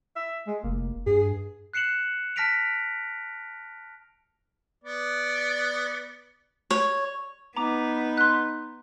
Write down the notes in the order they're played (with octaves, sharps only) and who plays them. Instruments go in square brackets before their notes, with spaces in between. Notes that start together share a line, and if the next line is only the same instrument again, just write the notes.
[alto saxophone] E5
G#3
[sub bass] F1 [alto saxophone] A#3
[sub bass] G2 [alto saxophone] G#4
[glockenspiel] F#6 C7 C#7 E7 F#7
A5 F6 A#6 B6 D7 F7
[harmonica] B3 D5
[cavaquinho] C#5
[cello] B3 [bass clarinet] D#4 [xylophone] A#5 D6
[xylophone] C6 F#6